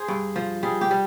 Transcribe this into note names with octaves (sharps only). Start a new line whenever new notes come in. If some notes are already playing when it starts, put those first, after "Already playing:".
Already playing: G#4 C5
G2
F3
G3 G#4
G4
G3